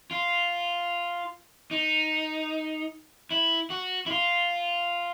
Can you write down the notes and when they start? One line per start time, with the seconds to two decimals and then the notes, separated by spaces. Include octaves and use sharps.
0.11 F4
1.71 D#4
3.31 E4
3.70 F#4
4.06 E4
4.11 F4